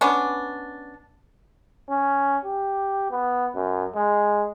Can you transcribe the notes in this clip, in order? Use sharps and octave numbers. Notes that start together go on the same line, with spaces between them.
B3 C#4 D4
C#4
G4
B3
F#2
G#3